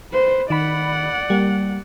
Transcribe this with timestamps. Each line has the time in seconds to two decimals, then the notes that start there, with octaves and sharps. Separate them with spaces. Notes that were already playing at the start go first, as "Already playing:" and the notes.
0.12 B4 C5
0.50 D#3 D5 F#5 B5
1.30 G3 A#3